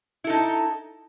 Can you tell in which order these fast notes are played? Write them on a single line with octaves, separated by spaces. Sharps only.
E4 A4 D#4